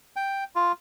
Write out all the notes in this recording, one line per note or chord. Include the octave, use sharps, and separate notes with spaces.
G5
F4